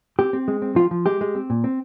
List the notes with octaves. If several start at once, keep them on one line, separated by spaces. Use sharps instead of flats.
C4 G4
C4
G#3
C4
F3 F4
F3
G#3 G4
G#3
C4
A#2
C4